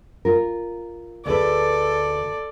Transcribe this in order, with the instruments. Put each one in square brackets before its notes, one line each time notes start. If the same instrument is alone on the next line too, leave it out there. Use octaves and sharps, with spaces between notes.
[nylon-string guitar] F4 A#4
[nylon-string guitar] D2 G#4 B4 [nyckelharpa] A4 D5